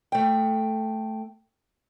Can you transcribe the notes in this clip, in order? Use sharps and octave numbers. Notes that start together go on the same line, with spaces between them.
A3 G5